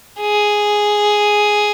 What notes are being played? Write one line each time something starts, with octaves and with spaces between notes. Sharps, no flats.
G#4